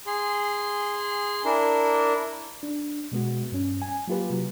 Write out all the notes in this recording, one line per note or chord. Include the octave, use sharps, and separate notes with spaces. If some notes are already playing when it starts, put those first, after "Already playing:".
G#4 C6
D4 E4 A#4
D4
B2 G#3 B3 F#4
G2 C#4
G#5
F#3 A#3 F4 G4 B4
C3 F#3